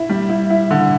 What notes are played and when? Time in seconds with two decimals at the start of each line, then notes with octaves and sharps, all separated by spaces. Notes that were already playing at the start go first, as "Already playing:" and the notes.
Already playing: E4
0.10 G3
0.29 E4
0.50 E4
0.71 D3